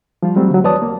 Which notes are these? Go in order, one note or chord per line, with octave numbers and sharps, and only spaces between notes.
F3 G3 F4
F#3 G3 A3 C4
D3 F#3
E2 B4 C#5 D5 A5 D#6
A#3